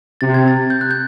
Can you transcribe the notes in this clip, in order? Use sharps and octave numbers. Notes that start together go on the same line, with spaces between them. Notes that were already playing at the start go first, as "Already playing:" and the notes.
C3 A6
G#6
A6
G6
F#6
G6